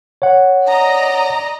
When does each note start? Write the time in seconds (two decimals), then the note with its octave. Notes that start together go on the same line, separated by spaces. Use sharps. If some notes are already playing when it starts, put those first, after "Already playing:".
0.22 C#5 F#5
0.65 D5 D#5 A#5